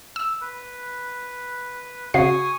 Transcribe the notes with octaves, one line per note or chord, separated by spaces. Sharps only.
E6
B4
C#3 F#4 G#5 C#6 D#6 C7